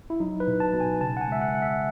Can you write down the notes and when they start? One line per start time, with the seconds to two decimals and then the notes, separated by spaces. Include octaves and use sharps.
0.10 E4
0.20 F#3 D#4
0.40 B4
0.47 B2
0.60 A5
0.74 B2
0.80 G#5
1.01 C#3 A5
1.17 F#5
1.21 G#5
1.28 G#3 E5
1.42 F#5
1.55 C#3 F#5
1.62 E5